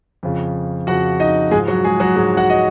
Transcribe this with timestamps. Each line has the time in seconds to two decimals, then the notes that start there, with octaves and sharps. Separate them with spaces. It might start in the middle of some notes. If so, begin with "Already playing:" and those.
0.23 F2 C#3 F3
0.87 F2 C#3 F3 F#4 F#5
1.20 D#4 D#5
1.51 G#2 F3 G#3 G#4
1.67 F#3 F#4
1.84 G#3 G#4
2.00 F#3 F#4
2.16 G#2 F3 G#3 G#4
2.37 F#4 F#5
2.50 D#5